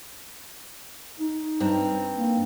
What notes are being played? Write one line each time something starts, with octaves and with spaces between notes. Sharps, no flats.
D#4
G2 C4 A#5
A#3